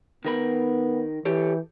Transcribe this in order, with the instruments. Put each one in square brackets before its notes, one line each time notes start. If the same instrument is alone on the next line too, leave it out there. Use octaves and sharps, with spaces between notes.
[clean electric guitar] D#3 A#4 B5 [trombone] B3
[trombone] E3 [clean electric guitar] G4 A4 C#5